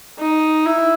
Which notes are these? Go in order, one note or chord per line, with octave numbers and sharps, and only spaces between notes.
D#4
E4